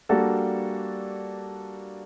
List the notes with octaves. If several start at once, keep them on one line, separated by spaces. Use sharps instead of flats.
G3 A#3 D4 F#4 A4